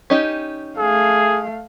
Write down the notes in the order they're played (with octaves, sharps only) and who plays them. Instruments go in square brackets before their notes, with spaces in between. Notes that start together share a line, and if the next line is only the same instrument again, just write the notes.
[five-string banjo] C#4 D#4 G4
[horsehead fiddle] A3 F5 [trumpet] G#4